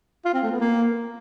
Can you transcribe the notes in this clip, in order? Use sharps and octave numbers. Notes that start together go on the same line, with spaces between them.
F4
C4
A3
B3
A#3